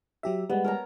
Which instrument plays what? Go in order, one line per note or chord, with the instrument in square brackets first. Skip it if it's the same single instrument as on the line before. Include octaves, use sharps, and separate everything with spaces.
[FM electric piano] F#3 G4 E5 [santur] A#5
[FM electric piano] G3 G#3 [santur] B3
[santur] A#4 C#5 A#5